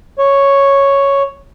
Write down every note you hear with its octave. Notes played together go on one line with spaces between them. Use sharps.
C#5